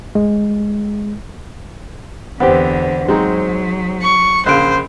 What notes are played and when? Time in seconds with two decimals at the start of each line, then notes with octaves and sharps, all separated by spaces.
0.15 G#3
2.40 E2 D3 B3 C4 G4 C5 F#5
3.08 F#3 G#3 C4 D#4
4.02 C#6
4.46 A#1 C#3 C5 F5 F#6 D7